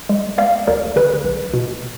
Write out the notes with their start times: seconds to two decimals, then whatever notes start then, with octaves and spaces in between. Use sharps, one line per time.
0.09 G#3
0.38 B3 D5 F5
0.67 D2 A#4 D5
0.96 D3 G#4 B4
1.24 B1
1.54 B2